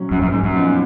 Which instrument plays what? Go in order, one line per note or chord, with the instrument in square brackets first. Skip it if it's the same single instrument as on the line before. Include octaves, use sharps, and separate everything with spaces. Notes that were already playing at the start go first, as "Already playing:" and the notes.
Already playing: [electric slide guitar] A#2 F#3 C#4
[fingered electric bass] F#2
F#2
G#2
F#2
[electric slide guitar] A#2 F3 B3 D#4